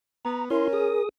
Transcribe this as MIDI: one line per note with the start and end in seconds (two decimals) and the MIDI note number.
0.25 0.47 59
0.25 0.45 82
0.50 0.98 61
0.50 0.68 64
0.50 1.02 70
0.50 0.68 84
0.73 1.09 68
0.73 1.09 87